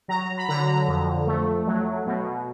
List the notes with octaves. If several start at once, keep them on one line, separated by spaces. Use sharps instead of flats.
F#3 A#5
B5
D3 A#5
F2
A3
F#3
B2